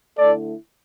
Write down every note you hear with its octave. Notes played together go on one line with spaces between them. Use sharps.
D3 A3 E4 A4 D5